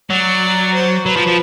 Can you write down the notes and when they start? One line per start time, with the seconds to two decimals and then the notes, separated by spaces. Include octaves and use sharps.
0.10 F#3 D5
0.74 C5
1.06 F#3 B4
1.16 F3
1.27 F3